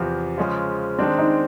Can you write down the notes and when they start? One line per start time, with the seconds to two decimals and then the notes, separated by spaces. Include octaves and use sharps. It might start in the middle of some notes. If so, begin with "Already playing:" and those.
Already playing: E2 C3 F3
0.38 C#3 F3 G#3 C#4 F4
0.99 D#3 G#3 C4 D4
1.18 D#4